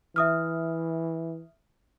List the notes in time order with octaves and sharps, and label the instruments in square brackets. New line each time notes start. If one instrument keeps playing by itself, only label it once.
[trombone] E3 [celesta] E5 D#6 F6